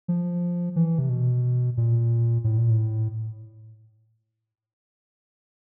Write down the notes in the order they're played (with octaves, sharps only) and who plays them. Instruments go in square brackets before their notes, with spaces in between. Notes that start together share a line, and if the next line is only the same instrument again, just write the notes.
[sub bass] F3
E3
C3
B2
A#2
A2
A#2
A2